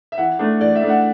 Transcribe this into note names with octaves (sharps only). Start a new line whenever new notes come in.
E5
E3 F#5
A3 D4
E3 D5
E5
A3 D4
F#5